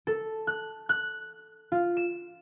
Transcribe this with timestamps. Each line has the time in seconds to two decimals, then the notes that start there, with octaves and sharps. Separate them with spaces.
0.07 A4
0.47 F#6
0.89 F#6
1.72 F4
1.97 E7